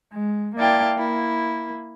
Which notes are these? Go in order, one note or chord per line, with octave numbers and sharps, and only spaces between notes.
G#3
A#3 E4 D5 F5 G5 A5
A#3 E4